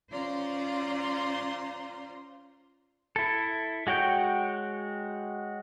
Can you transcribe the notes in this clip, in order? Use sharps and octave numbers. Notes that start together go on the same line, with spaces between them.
C#4 F4 C5 D5 A#5 C6
E4 A4
G#3 F#4 C#5 G5 G6